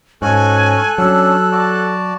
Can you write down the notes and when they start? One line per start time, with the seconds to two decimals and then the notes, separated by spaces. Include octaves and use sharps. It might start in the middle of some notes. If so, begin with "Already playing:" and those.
0.22 G#2 C#4 F#4 A4 G#5 F#6
0.98 F#3 C#4 D4 E6
1.52 F#4 D5 A5